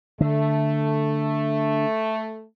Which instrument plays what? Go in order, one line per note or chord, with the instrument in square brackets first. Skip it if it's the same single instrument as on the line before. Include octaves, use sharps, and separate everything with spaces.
[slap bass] D3 [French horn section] A3